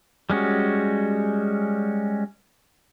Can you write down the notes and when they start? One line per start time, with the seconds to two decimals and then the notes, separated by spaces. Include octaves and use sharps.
0.30 G3 G#3 C#4 F#4